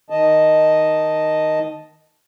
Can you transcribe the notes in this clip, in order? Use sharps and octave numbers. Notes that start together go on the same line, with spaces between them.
D#3 D#5 A5